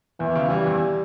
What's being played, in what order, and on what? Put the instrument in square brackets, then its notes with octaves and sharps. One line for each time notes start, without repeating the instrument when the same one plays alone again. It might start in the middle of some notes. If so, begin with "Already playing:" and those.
[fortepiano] E2 [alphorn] E3
[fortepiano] C#3
[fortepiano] E3 [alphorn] G3
[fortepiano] E2